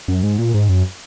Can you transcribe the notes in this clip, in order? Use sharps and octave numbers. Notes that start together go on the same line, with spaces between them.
F#2
G#2
A#2
G#2
F#2